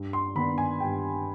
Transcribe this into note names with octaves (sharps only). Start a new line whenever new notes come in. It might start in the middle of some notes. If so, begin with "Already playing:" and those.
Already playing: G2
C6
D#3 B3 D4 B5
G#5
G2 G5